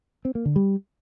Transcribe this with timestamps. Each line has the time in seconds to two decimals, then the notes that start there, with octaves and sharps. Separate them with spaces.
0.25 C4
0.35 A#3
0.45 D3
0.56 G3